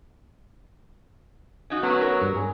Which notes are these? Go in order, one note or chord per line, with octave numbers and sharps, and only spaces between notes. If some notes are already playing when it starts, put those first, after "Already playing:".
C#4 D#4 F#4
F#3 A3 B3 C#4
A#4 C#5
G2
G#4